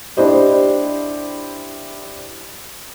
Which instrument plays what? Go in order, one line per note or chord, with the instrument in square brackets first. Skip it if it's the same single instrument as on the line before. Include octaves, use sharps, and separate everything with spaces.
[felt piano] D4 E4 G4 C5 D#5